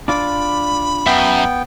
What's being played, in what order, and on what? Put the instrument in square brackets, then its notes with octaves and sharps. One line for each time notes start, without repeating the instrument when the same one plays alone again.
[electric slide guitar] D4 F4 D5 [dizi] B5
[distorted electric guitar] F#2 [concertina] B3 G5 [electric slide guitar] E5